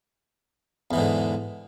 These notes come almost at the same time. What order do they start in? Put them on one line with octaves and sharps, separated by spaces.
E2 E3 G#2 D3